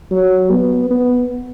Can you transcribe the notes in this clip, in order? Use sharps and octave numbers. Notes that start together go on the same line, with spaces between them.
F#3
B3
B3